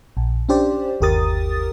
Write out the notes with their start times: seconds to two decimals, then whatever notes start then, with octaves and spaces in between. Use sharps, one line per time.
0.17 A#1
0.49 C#4 D4 G4 C5 D5
1.01 G1 D#2 G4 A#4 D#6 A6